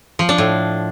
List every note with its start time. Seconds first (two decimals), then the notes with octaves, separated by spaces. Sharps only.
0.19 F3
0.29 D4
0.38 A2